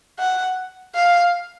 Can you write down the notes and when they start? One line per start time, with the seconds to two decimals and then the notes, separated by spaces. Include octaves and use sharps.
0.19 F#5
0.96 F5